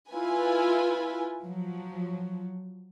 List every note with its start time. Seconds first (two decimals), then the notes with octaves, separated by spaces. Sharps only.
0.11 E4 F4 B4 G#5
1.43 F3 F#3